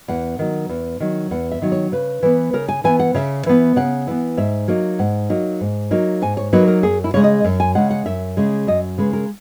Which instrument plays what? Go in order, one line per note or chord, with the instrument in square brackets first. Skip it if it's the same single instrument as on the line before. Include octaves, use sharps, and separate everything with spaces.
[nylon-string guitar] E2 F#5
D#3 F#3
E2
D#3 F#3
E2 F#5
E5
D#3 F#3
C#5
C#3 B4
E3 B3
C#3 A#4
G#5
E3 B3 G#5
F#5
C#3 E5
E3 B3
C#3 F#5
E3 B3
G#2 E5
F#3 A#3 D#4
G#2 F#5
F#3 A#3 D#4
G#2
F#3 A#3 D#4
G#2 G#5
C#5
F#3 A#3 D#4 B4
A#4
F#2 G#4
E4
C#3 G#3 C#5
D#5
F#2
G#5
C#3 G#3 F#5
F#5
F#2 E5
C#3 G#3
F#2 D#5
C#3 G#3 B4
A#4